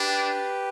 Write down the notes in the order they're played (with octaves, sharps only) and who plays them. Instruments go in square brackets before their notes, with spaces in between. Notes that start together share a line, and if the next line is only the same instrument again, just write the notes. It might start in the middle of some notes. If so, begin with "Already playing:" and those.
Already playing: [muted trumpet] D4 [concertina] G4 B4